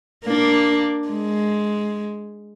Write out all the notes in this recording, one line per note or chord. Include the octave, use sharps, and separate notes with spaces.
A#3 D4
G#3